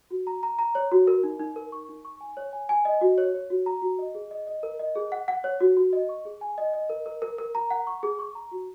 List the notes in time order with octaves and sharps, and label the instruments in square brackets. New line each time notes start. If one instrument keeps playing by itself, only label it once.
[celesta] F#4
A#5
A#5
A#5
C#5
F#4
A#4
D#4
D#4
A#4
C#6
D#4
C#6
G#5
C#5
G#5
G#5
D#5
F#4
C#5
C#5
F#4
A#5
F#4
D#5
G#4
D#5
D#5
A#4
D#5
G#4
F#5
F#5
C#5
F#4
F#4
D#5
C#6
G#4
G#5
D#5
D#5
A#4
A#4
A#4
A#4
A#5
F#5
C#6
G#4
C#6
A#5
F#4